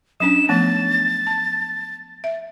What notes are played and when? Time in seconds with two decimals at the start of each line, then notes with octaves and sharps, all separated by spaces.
0.20 F#3 C#4 D4 E7
0.49 F3 A3 B3 A6
1.27 A5
2.24 E5